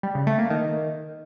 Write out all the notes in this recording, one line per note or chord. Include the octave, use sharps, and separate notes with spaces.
G3
C#3
A3
A#3
D#3